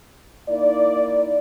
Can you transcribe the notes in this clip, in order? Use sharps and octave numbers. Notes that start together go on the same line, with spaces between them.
A#3 D#4 E4 D5